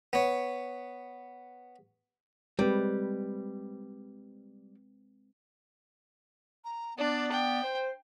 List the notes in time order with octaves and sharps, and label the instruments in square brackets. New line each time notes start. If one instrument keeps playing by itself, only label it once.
[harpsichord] B3 C#5
[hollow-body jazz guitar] G3 [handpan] G#3 C4 B4
[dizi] A#5
[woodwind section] B3 [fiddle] D4 [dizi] D5
[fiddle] G5
[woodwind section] C5